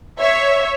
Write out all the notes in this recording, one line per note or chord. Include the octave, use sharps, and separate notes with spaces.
C#5 E5